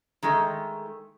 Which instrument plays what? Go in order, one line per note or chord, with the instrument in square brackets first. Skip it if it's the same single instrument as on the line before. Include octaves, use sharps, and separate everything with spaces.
[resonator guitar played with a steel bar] D#3 G#3 A3